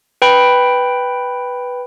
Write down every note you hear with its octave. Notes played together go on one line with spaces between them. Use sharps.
B4 G5 B5